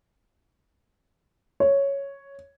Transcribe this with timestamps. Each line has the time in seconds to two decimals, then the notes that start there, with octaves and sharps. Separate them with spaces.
1.60 C#5